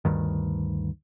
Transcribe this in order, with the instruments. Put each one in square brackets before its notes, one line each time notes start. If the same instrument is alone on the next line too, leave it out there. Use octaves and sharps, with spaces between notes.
[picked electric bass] D2 G2 D#3